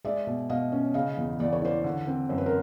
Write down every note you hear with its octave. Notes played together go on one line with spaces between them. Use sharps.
G#3 D5 E5
B2
B2 D#5 F5
C#4
C#3 D#5 F5
E2
E2 D5
C#5
E3 C5 D5
D3
C4
F#2 C5
B4
A#4 C5